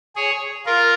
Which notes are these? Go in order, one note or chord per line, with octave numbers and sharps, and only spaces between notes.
G#4 C#5
F4 A#4